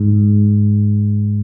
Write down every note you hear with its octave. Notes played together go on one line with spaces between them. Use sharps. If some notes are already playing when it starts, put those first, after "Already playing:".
Already playing: G#2